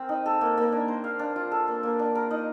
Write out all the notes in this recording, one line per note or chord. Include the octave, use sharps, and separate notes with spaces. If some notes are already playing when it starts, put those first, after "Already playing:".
Already playing: C4 A#4
D#4
A4
A#3
A#3
D4
C5
F5
D4
F4
A4
A#3
A#3
D4
A#4
D#4